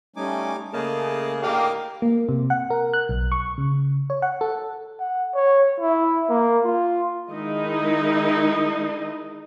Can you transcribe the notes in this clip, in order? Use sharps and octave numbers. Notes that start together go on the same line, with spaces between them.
G3 A3 C#4 D#4 G#5 D6
C#3 A3 A#3 G#4 D#5 A5
A2 D3 A#3 G4 D#5 F5 D6
A#3
C3
F#5
A#4
F#6
B1
C#6
C#3
C#5
F#5
A4
F#5
C#5
E4
A#3
F4
D#3 G#3 D#4 E4 D#5